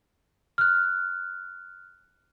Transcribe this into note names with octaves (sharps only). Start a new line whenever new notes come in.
F6 F#6